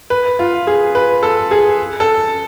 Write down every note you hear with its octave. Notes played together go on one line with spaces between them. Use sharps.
B4
F4
G#4
B4
A4
G#4
A4